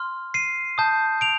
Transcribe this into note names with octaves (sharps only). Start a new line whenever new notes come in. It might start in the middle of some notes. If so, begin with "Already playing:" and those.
Already playing: C6 F6
C7 D#7
A5 D#6 G6
D7 F7